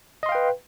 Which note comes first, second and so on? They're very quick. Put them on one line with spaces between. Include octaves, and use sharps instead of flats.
D#5 C6 F5 G5 B4